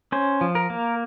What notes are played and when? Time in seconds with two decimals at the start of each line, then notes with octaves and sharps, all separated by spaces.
0.12 C#4 C5
0.41 F3
0.55 A#4
0.70 A#3